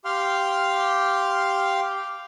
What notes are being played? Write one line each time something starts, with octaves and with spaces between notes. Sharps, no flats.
G4 F5 G5 C6 F6